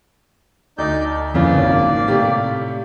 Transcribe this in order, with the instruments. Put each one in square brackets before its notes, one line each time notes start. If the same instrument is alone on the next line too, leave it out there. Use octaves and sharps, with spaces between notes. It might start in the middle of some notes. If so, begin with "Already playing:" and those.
[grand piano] D2 [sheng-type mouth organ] D#4 D5 G6
[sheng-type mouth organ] A4
[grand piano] F2 C#3 E3 [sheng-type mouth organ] A#3 D5
[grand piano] G#1
A2 C3 G4